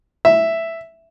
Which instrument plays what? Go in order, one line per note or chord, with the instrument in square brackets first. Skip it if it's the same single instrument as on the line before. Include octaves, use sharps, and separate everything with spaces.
[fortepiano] E5